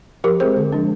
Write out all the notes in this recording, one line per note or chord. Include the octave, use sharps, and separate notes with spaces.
F3 G4 A#4
G#3 C4 G#4 C5
D3
F3 G#3 D4